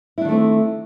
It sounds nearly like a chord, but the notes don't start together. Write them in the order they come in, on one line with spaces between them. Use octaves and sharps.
E4 D4 D#3 A3 C4